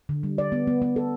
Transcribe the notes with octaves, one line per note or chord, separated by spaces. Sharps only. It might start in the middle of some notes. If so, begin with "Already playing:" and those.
D3
G3
D5
B3
B3
B3
A4